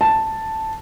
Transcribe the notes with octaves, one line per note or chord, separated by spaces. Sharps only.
A5